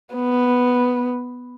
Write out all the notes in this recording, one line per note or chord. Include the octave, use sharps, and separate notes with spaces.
B3